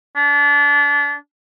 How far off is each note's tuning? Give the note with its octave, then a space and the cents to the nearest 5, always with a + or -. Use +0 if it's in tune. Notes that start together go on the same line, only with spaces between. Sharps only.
D4 -30